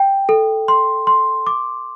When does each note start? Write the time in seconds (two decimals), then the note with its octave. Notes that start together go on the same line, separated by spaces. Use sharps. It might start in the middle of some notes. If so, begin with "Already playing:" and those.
Already playing: G5
0.29 A4
0.68 C6
1.07 C6
1.47 D6